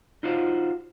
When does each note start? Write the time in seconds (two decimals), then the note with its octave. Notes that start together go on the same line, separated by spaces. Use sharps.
0.23 D#4 F4 F#4 C5 F5